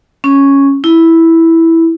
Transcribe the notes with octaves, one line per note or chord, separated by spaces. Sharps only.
C#4
E4